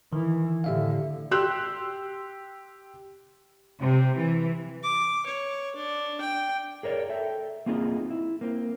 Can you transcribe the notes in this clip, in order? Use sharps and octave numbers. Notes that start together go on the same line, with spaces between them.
D#3 E3
A2 D3 G4 E5 F5
G4 C6 E6 F#6
C3
E3
D6
C#5
D4
G5
G#4 A#4 C#5 D5
A4 E5 G5
A#3 C4 D#4 F4 G#4
E4
A#3 C4